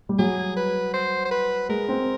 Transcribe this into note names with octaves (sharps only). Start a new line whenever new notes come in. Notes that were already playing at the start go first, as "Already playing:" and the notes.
G3
F#3 G#4
B4
C5
C5
B4
G#3 A#4
C4